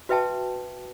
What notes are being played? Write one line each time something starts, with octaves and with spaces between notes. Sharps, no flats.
F#4 B4 E5 G5 A5